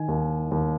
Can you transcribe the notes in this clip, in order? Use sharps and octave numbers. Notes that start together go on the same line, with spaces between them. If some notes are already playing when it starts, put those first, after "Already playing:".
Already playing: D#3 G#5
D#2
D#2